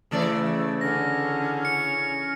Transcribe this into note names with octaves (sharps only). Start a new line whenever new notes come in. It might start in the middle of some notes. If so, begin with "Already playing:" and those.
C#3 E3 A3 D5
D3 C#4 A#6
C#7